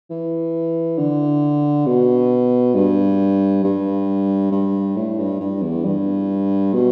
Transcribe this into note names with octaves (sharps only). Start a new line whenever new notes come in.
E3
D3
B2
G2
G2
G2
A2
G2
G2
E2
G2
B2